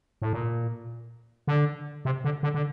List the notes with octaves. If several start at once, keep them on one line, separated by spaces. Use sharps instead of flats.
A2
A#2
D3
C3
D3
D3
D3